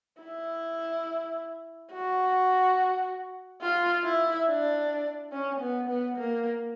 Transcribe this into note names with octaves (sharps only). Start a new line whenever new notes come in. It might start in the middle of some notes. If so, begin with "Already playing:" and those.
E4
F#4
F4
E4
D4
C#4
B3
B3
A#3